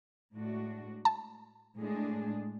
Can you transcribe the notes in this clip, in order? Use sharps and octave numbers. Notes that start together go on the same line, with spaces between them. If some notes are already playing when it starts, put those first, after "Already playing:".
A2 G#3 D4 F#4
A5
A2 G#3 D4 G#4